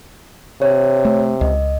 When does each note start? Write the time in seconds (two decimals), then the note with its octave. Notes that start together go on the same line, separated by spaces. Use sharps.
0.62 C3 C#5
1.05 A3
1.41 C#2 D#5